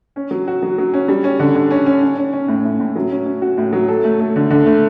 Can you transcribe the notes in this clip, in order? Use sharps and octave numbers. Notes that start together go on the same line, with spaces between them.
C#4
F#3
F#4
F#3
F#3
C#4
G3
C#4
D3
D3
C#4
C#4
C#4
C#4
C#4
A2
A2
A2
F#3
C#4
C#4
F#4
A2
F#3
A4
A3
A3
D3
D3
A3